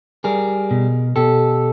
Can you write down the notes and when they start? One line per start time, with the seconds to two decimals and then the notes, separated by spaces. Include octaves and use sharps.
0.24 G3 G#4 A#4
0.71 B2
1.16 B2 G4 A4